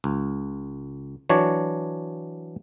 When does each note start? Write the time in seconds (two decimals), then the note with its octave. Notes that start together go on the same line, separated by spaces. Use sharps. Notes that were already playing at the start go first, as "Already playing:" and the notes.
0.04 C#2
1.30 E3 F#3 D4 C#5